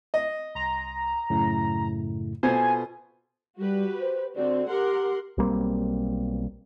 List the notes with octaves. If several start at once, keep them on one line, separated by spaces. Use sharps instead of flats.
D#5
C2 A#5 C6
F#2 A2 C#3
B2 F4 A4 B4 C5 G#5
G3 F#4 G4 B4
C5
D3 C4 F#4 D5
G4 A#4 F#5 C6
B1 G3 A#3 C4